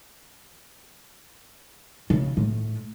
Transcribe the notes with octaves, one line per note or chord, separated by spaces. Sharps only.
C#3
A2